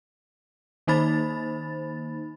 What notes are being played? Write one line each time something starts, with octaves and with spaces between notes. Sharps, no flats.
D#3 A#3 D#4 C5 B5 A6